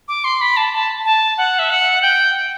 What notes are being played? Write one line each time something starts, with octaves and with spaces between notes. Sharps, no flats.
D6
C6
B5
A5
A5
A5
F#5
E5
F#5
G5